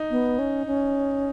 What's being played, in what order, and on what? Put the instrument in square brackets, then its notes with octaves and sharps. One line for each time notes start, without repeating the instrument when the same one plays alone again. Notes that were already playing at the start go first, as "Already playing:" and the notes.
Already playing: [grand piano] D#4
[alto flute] B3
C#4
C#4